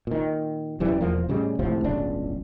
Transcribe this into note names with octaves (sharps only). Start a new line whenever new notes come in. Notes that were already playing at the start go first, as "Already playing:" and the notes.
A#2 D#3
E1 F#2 E3 G3
E1 E2 F3 A#3
A2 C#3 G3 G#3
C#2 A2 C3 F3
D1 G1 C#2 D4